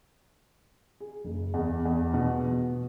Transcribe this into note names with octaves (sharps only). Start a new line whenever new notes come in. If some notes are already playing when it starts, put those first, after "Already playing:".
G#4
F#1
E2
E2
B2
B2